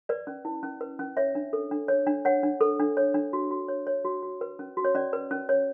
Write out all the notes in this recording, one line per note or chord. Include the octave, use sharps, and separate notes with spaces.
B4 D5
C#4
E4
C#4
B4
C#4
C#5 E5
D4
A4
D4
C#5
D4
C#5 F#5
D4
A4
D4
C#5
D4
F#4
F#4
C#5
C#5
F#4
F#4
B4
C#4
F#4
C#5
C#4 D5
B4
C#4
C#5